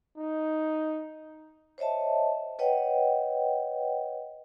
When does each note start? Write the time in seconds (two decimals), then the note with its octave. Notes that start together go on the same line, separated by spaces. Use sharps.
0.18 D#4
1.78 C5 C#5 D#5 E5 A5
2.59 B4 C#5 D#5 F#5 G5